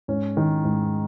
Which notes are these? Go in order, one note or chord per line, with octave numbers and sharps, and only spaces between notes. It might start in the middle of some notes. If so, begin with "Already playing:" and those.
G#2 C#4
D#3
G#2